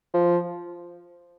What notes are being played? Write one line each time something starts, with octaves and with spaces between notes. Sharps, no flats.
F3